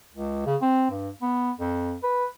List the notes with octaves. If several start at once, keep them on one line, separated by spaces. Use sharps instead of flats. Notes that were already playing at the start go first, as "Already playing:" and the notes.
C#2
C#3
C4
G2
B3
F2
B4